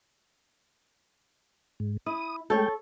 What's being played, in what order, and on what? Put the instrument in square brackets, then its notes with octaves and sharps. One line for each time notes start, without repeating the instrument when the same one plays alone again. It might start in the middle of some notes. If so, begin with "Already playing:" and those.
[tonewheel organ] G#2
[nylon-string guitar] E4 [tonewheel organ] D#6
[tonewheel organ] G#3 A3 G5 [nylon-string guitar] A4 C#5